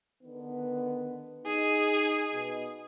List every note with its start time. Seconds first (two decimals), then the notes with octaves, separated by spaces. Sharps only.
0.23 D3 D#3 B3
1.46 D#4 G#4
2.34 B2